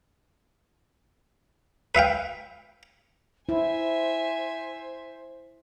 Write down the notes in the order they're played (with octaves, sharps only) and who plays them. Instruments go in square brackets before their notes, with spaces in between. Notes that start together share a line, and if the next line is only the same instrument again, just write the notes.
[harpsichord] B4 E5 F5 G5
[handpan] E4 [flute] C5 [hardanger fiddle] E5 G#5